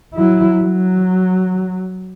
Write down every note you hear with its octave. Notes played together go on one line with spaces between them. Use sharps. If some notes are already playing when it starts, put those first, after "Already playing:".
F#3 E4
F#3